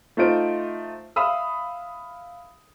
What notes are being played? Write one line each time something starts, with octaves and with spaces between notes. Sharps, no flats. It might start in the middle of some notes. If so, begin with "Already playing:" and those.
A3 D#4 F4 C5 D7
E5 F5 B5 D#6 E6